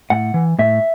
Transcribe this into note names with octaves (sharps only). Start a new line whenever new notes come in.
A2 F#5
E3
A2 E5